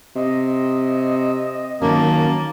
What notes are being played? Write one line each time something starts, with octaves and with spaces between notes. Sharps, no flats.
C3 D#5
F#2 D#3 A#3 C#4 A5